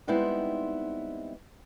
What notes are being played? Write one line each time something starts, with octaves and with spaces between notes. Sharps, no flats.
G3 G#3 B3 C4 D#4 E4